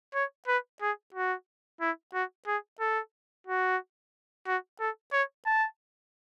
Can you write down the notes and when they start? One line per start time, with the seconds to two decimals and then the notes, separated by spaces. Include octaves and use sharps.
0.14 C#5
0.48 B4
0.81 G#4
1.14 F#4
1.81 E4
2.14 F#4
2.47 G#4
2.80 A4
3.47 F#4
4.47 F#4
4.80 A4
5.13 C#5
5.46 A5